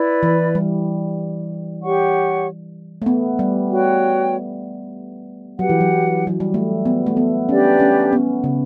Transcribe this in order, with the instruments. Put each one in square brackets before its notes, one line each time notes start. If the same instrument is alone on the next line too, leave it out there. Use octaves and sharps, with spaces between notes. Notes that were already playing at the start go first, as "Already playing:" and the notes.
Already playing: [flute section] E4 B4 D5
[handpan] E3
G3
[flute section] G4 C#5 F#5 C#6
[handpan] A3
B3
G3
[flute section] F#4 C#5 G5
[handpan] F#3 [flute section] G4 B4 F#5
[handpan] E3
F#3
F#3
G3
A3
B3
A3
B3
[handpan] C#4 [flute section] D4 G4 B4 D5
[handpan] C#4
B3
C#3